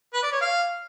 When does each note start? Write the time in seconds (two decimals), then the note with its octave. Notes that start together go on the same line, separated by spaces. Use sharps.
0.13 B4
0.23 D5
0.32 C#5
0.41 F5